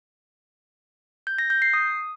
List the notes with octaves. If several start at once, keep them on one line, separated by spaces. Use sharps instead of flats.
G6
A#6
G6
C7
D#6